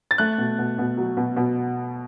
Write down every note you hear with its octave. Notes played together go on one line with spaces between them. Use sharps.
A6
A3 F#6
B2
B2
B2
F#3
B2
B2